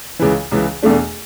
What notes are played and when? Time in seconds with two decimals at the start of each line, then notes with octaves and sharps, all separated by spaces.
0.19 C#2 C#3 E3
0.52 C#2 C#3 E3
0.82 E2 B2 A3 D4